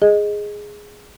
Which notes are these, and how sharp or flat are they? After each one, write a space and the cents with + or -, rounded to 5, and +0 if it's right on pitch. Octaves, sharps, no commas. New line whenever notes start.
G#4 +0 D#5 +0